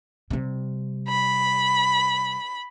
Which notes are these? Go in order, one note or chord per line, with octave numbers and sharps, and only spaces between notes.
C3 G3
B5